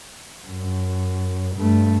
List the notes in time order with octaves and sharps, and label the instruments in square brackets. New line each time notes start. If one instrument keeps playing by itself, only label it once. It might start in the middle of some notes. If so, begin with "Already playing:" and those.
[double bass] F#2
G2 A3